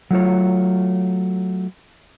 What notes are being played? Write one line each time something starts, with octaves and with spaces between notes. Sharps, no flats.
F#3 A3 F4 C#5